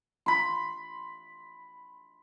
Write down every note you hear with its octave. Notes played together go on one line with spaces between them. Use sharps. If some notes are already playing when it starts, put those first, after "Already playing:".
B5 C6